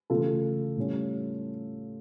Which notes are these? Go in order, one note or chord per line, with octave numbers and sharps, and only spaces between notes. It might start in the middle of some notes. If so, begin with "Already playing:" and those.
C#3 E3 A3 F4 A4
A2 G3 C#4